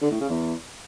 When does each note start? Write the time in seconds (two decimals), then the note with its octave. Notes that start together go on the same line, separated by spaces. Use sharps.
0.02 D3
0.11 A2
0.20 C#3
0.29 E2